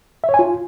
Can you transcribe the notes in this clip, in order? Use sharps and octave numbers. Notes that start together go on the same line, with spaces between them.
E5
C#5
G#5
F4